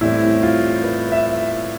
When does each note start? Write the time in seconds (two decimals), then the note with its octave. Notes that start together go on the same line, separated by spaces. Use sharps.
0.01 A2 E3 G3 C4 E4
0.43 F4
0.84 B4
1.12 E5